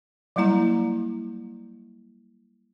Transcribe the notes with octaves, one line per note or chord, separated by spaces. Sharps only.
F#3 G3 A#3 E4 A#5